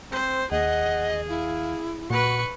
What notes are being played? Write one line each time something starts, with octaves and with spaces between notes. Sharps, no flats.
C4 C5
D#2 G#4 D#5 F#5
E4 F5
A#2 F#4 B4 C#6